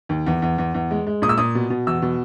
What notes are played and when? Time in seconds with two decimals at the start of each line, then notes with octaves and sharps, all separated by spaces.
0.09 D#2
0.26 E2
0.42 E2
0.58 E2
0.74 E2
0.91 G#3
1.07 G#3
1.22 A#2 D#6
1.29 E6
1.38 A#2 D#6
1.55 B2
1.70 B2
1.87 E2 E6
2.02 B2